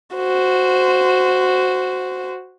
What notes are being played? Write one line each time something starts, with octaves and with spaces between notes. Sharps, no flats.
F#4 C5